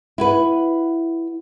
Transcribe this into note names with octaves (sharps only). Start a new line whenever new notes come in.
E4 F#4 B4